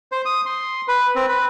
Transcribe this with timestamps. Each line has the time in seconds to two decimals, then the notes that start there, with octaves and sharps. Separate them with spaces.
0.12 C5
0.26 D#6
0.46 C6
0.88 B4
1.16 C4
1.29 B4